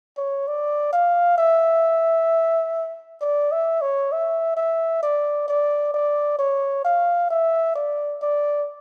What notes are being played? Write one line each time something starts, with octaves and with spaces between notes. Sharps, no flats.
C#5
D5
F5
E5
D5
E5
C#5
E5
E5
D5
D5
D5
C#5
F5
E5
D5
D5